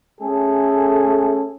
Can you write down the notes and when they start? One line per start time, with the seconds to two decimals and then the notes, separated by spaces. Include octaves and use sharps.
0.20 A3 C#4 G#4 A4